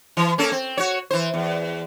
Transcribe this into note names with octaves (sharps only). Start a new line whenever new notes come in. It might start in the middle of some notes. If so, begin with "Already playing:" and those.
E3
A#3 C#4 A4
C4
F#4 C#5
E3 C5
E2